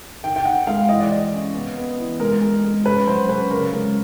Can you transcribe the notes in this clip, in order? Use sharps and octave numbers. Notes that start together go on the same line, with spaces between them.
D#3 G5
G5
D#3 F#5
G#3 F5
E3 D#5
D5
E3 D#5
C#4
B3
B3
E3
G#3 A#4
G#3
G#3
C#4 B4
F#3 C5
C#4 B4
C#3 A#4
G#3